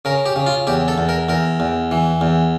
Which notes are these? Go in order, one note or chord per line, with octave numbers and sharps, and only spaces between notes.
C#3 A#4
G4
C#3
F4
E2 G4
A4
E2
A#4
E2 A#4
E2
E3
E2